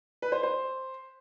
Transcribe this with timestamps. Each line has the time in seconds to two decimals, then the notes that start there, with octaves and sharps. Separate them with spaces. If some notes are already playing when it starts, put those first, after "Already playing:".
0.22 B4
0.32 C5
0.43 C5